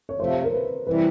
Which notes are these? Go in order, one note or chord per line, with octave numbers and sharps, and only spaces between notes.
C#5
C3 F3 A3 C5
A#4
B4
C3 E3 G3 C4 E4 B4